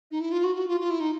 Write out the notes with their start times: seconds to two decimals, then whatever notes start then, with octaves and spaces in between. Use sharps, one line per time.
0.11 D#4
0.20 E4
0.32 F4
0.44 F#4
0.56 F#4
0.68 F4
0.81 F4
0.91 E4
1.00 D#4